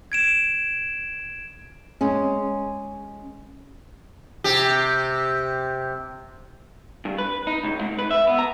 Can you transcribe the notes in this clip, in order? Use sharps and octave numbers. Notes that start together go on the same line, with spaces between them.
G#6 D7 E7
G#3 C#4
C3 G4
G2
B4
D#4
C#2
G#2
B4
E5
B3
A#5